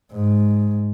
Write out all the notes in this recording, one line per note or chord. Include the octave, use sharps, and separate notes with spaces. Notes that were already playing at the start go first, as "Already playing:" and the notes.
G#2